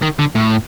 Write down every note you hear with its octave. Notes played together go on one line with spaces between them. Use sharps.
D#3
D3
A2